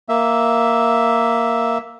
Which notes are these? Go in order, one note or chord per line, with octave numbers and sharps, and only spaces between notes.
A#3 E5